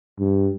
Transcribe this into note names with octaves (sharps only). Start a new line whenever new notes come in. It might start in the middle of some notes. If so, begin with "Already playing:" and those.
G2